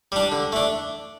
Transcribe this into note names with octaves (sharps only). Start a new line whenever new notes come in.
G3 D4
D3
A3 D4